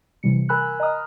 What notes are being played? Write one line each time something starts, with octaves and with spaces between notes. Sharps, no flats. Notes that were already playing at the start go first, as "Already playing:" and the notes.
C3 E3 G3 C#7
A#4 G#5 B5 E6 F#6
D#5 A#5 B5 D#6 F6